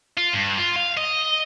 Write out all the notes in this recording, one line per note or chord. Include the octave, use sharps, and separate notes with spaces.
F4
G2
F4
F5
D#5